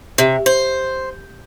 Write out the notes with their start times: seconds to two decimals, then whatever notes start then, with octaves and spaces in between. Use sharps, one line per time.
0.18 C3
0.46 C5